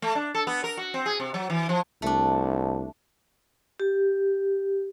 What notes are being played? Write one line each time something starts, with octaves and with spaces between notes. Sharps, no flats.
A3
D4
A4
B3
A#4
F#4
C4
G#4
C3
F#3
E3
F3
C2 A3 D4
G4